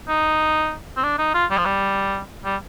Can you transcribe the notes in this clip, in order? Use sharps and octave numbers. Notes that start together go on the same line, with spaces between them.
D#4
C4
D4
D#4
F4
G3
F3
G3
G3